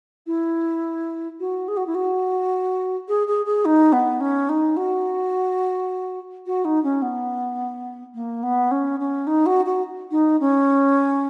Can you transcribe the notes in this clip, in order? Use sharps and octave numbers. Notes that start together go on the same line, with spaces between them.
E4
F#4
G#4
F#4
E4
F#4
G#4
G#4
G#4
D#4
B3
C#4
D#4
F#4
F#4
D#4
C#4
B3
A#3
B3
C#4
C#4
D#4
F#4
F#4
D#4
C#4